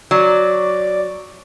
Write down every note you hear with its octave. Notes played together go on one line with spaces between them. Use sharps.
F#3 D5